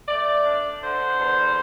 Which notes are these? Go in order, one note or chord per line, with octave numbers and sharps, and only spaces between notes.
A3 D5
D4
D3 C5
E2